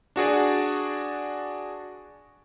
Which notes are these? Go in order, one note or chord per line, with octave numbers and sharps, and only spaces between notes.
D4 F#4 G#4 D5